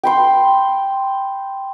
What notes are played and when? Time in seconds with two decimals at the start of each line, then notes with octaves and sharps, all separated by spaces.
0.03 G5 B5 C6